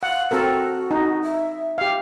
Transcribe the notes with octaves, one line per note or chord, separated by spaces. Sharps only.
F5 F#5
C4 F#4 A4 A#4
D#4
E5
G4 F5